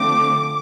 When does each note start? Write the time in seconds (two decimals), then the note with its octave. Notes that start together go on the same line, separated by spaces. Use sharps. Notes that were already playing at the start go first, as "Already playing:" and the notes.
Already playing: D3 F3 A3 C4 D6